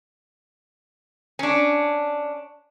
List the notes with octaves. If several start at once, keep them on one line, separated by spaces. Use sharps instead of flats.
C#4 D4